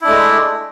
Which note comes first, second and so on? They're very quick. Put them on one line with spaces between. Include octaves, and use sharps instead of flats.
E4 D4 A3 G#3